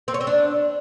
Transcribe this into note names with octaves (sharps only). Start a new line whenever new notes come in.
C4
C#5
C4
D4